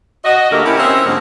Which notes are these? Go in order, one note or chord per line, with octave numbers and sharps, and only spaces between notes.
F#4 D#5
A#2 D3 A3 A#3 G4 A#4
C#4 E4 F4 G4 A#4
C4 C#4 D#5 E5
G#2 D3 F3 A#3 C4